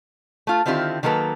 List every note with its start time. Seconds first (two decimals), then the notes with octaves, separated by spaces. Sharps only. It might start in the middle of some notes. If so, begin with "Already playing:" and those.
0.47 A3 F4
0.66 D3 D#3 C4 E4 F4 G4
1.03 D#3 F#3 A#3 A4 B4